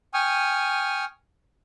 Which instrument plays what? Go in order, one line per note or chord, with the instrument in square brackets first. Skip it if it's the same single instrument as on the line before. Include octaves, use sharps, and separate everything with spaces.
[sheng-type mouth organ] G5 G#5 C#6 D#6 F6